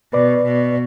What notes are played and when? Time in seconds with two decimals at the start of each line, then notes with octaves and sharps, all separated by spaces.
0.13 B2 B4 D5
0.44 B2